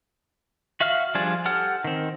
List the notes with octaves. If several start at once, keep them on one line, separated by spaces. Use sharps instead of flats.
F#4 E5 F5 F6
F3 G3 D4 F4 G#4
G4 A4 F#5 F6
D#3 C4